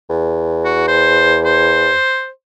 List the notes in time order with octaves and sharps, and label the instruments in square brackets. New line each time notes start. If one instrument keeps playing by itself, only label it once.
[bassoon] E2
[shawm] F#4
C5
C5